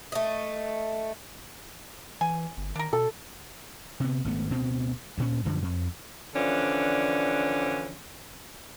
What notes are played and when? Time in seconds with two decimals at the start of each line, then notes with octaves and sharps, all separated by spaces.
0.12 A3 D#5
2.21 E3 G#5
2.57 G1
2.75 D#3 D4 A#4
2.93 B2 A4
4.00 C3 B3
4.25 G#1 A3 B3
4.50 D2 B2 C4
5.18 D2 A#2 C#4
5.45 F#2 D3 F3 G3
5.62 F2
6.35 D3 E3 F3 C#4 D4